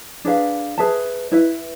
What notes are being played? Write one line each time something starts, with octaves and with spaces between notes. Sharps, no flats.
D4 G#4 B4 F5
G#4 B4 E5 A5
E4 B4 E5